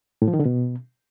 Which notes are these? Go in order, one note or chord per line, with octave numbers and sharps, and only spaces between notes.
A2
F3
D#3
D3
B2